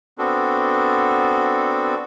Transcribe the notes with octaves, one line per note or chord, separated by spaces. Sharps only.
B3 C4 D4 F#4 A4